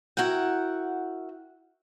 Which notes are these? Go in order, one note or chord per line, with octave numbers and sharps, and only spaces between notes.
E4 F#4 A#4 F#5 G5